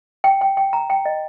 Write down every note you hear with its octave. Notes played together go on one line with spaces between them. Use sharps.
G5
G5
G5
A#5
G5
D#5